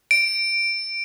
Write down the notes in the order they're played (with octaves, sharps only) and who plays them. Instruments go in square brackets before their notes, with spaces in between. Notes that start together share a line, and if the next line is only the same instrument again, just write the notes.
[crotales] D7